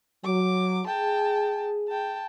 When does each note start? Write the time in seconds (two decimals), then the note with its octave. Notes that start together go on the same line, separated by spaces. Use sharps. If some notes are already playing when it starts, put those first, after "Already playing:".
0.24 F#3 D6
0.87 G#4 G5 A5
1.88 G5 A5